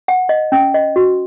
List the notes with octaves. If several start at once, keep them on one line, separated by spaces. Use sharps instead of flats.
F#5
D#5
C#4
D#5
F#4